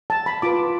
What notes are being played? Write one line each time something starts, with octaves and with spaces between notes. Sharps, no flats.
A5
B5
F4 B4 D6